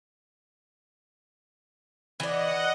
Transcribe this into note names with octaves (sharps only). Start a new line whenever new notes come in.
E3 D5 D#5 F#5